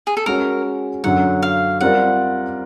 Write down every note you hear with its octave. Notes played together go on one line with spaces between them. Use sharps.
G#4
A4
G#3 C#4 F#4 A#4
F#2 D3 F#3 F#5
F5
G3 C4 F4 A#4 D5 F#5